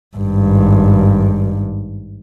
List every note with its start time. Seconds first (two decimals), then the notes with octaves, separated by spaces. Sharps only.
0.17 G#1 G2